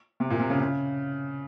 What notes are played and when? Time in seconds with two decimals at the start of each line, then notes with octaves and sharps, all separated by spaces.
0.20 C3
0.30 A#2
0.40 C3
0.50 C#3
0.60 C#3